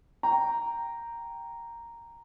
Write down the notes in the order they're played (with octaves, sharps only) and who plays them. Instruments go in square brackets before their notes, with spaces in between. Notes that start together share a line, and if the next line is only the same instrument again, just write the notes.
[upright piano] G5 A#5